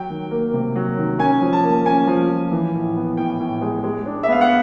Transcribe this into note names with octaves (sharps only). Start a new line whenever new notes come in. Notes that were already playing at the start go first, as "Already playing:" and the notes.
Already playing: F#3 G5
D#3
A#3
C3
F#3
D#3
C#4 G#5
F3
A5
A#3
C#4 G#5
F3
F3
E3
A2
B3
A2 G5
A2
G#3
G#3
D4
E5
B3 F5
F#5